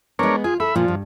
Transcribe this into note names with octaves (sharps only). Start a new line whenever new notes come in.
G#3 B3 D4 A#4 C#5
F4 G#4
A4 E5 B5
A#2 F3
G2